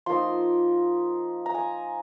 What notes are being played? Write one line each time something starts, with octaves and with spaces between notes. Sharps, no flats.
F3 A#3 D#4 C6
A#5
G#5